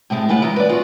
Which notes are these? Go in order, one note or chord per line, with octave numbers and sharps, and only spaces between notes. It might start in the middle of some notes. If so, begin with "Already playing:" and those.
A2 C3 G#3 A3
F#2 G#3 E4 F4 F#5
E3 G#3 A#5
B4 D5
F4 F#4